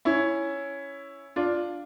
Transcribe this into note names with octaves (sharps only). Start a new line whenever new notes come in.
C#4 E4
D4 F4